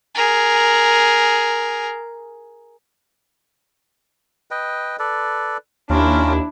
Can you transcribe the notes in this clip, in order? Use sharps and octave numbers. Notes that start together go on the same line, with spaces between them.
G#4 A#4
B4 D#5 G5
A4 B4 D5
D#2 C#4 D4 E4 F4 A#4